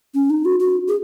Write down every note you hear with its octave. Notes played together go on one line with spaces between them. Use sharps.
C#4
D#4
F#4
F#4
G#4